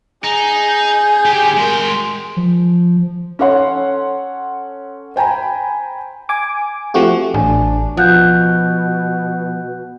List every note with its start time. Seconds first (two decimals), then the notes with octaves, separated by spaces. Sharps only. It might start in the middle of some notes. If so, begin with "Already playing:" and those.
0.24 D#4 G#4
0.65 G6
1.25 D3 G4
1.57 G#3 F#4 A#4 G5 C6
2.37 F3
3.39 C#4 A4 C#5 F#5 C6
5.16 C5 G5 G#5 A#5 B5
6.29 G#5 D6
6.94 F3 A3 C4 F#4 G4
7.34 A1 D4 G#5
7.97 B2 F3 F#5 F#6 G6